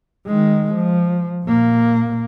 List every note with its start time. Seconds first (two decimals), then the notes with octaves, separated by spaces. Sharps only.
0.27 D#3 G#3
0.74 F3
1.44 A#2 A#3